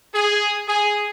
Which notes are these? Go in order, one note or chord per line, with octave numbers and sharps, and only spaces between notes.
G#4
G#4